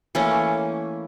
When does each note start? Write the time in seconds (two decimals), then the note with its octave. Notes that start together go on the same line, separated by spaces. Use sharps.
0.15 E3 A3 A#3 C#4